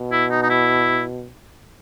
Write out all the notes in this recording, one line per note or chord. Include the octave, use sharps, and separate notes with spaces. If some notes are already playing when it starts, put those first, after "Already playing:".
Already playing: B2
E4
D#4
D#4
E4